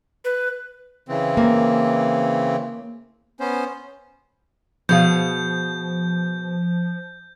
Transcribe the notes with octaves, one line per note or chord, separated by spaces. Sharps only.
B4
C#3 E3 C4
A#3
B3 C#4 C5
B2 F3 G#4 F5 G6